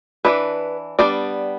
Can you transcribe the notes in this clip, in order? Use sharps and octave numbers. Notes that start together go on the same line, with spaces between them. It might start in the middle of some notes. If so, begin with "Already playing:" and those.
E3 A3 D4 B4
G3 B3 D4 D5